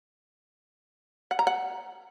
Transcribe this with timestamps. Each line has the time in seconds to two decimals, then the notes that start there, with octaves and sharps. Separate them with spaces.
1.31 F#5
1.39 A#5
1.47 F#5